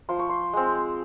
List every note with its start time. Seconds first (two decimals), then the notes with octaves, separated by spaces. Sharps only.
0.09 F3 C6
0.19 C#6
0.29 C6
0.53 G#3 C4